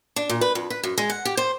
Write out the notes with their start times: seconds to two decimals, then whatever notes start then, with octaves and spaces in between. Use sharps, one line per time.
0.16 D4
0.30 A#2
0.41 B4
0.55 F2
0.70 B4
0.84 F#2
0.98 G#3
1.10 F#5
1.25 G4
1.37 C5